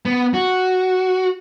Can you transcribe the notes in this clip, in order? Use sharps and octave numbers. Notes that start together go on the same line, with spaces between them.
B3
F#4